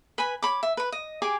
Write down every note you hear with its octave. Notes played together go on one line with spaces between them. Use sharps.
B4 G#5 B5
C#5 B5 D6
E5
B4 B5
D#5
G4 G#4 G#5 D6